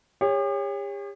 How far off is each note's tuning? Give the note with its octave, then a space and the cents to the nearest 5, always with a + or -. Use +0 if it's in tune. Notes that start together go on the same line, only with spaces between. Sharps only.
G4 +45 C#5 +0